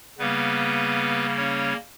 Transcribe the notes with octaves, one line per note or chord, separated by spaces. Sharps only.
C#3 G3 A#3 B3 B4
C#4 C#5